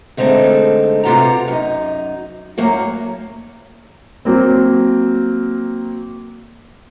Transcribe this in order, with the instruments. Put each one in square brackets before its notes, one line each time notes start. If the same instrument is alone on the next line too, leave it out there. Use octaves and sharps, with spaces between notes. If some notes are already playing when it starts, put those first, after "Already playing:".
[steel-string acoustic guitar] D3 G#3 A3 C4 D#4
C3 B3 F4 G4 F#5 A#5
F#2 D#4
F#2 A2 F#3 A#3 C#5
[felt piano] F#3 A#3 C4